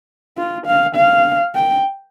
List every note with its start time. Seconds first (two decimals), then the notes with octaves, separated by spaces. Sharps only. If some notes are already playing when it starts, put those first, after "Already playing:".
0.38 F4
0.67 F5
0.96 F5
1.55 G5